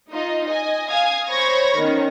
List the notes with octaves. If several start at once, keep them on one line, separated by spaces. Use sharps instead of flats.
D#4 F4 D#5
D#5 G#5
F5 G#5 D#6 G#6
C5 C#5 B5 C#6 G#6 A#6
D#3 B3 C#4